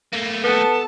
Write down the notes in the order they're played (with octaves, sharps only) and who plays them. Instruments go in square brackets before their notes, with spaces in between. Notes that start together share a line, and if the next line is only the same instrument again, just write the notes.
[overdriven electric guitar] A3 A#3
[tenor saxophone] B3 [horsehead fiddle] A4 A5